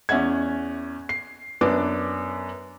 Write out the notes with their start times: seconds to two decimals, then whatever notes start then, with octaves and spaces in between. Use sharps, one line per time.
0.09 E2 C#4 E5 F#5 G#6
1.09 C7
1.61 F#2 B3 D4 D6